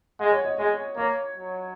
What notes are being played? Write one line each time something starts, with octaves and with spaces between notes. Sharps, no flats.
G#3 F#5
C#5
D#5
G#3 D#5
A#3 C#5
F#3